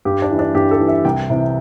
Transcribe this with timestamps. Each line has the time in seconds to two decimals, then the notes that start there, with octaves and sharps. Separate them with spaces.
0.05 G2 G4
0.22 D4
0.31 E3
0.39 D4
0.55 G2 G4
0.71 A4
0.80 E3
0.88 E5
1.05 C2 G5
1.30 C3 E3